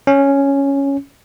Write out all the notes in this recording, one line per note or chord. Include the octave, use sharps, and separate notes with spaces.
C#4